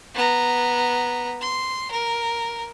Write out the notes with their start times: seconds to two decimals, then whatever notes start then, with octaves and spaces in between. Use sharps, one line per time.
0.14 B3 A#5
1.41 C6
1.91 A#4